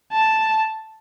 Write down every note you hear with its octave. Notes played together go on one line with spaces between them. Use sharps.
A5